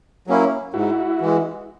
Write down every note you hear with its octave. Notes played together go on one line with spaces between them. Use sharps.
F#3 A#3 C#4 E4
G#2 E4 F#4
E3 G#3